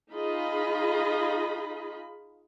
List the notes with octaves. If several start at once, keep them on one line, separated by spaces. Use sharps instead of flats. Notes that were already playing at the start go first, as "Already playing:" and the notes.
D#4 F4 G#4 D#5 B5